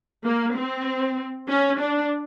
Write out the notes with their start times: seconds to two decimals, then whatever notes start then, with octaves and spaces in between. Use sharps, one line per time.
0.24 A#3
0.55 C4
1.49 C#4
1.80 D4